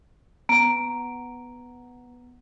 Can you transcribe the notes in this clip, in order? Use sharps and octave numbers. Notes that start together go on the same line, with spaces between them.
B3 A#5 D7